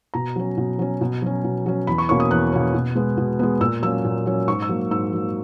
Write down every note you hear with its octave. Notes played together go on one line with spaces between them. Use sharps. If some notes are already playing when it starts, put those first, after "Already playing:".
B2 A#5
F#3 C#4
B2
F#3 C#4
B2
F#3 C#4
B2
F#3 C#4
E2 B5
C#6
B2 A#3 C#4 C#6
D#6
E2 F#6
B2 A#3 C#4
B2
G#3 B3
B2
G#3 B3
A#2 E6
F#3 A#3 C#4 E6
A#2
F#3 A#3 C#4
G#2 C#6
E6
F#3 A#3
G#2 E6
F#3 A#3